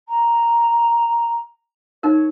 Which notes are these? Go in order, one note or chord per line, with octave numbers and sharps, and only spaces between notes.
A#5
D#4 A#4 C#5